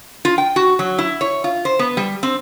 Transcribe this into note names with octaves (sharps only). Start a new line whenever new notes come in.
F4
G5
F#4
F#3
E4
C#5
F4
C5
B3
G3
C4